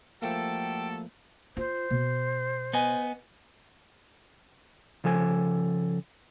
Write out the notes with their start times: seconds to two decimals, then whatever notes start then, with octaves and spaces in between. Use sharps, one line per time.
0.22 F3 G3 A3 A#3 F#4 A4 G5
1.57 F4 C5
1.91 B2
2.73 B3 D#5 G#5
5.04 C#3 F3 A4 G#5